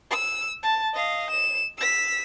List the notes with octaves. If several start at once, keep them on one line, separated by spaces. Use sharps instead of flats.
E6
A5
D#5 F5
E7
E6 B6